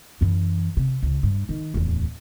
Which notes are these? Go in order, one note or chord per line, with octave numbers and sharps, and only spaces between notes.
F#2 E3
C3
C#2
G2
D#3
D1 E2